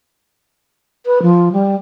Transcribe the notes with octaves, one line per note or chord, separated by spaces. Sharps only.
B4
F3
G3